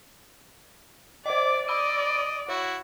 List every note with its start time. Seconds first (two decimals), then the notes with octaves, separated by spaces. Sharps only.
1.26 C5 D5 D#5 D6
1.68 D5 D#5 B5 E6 D#7
2.49 E4 F#4 C#5